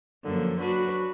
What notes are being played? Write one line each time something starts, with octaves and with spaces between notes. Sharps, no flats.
F#2 D3 F3 A#3
F#3 D4 F#4 B4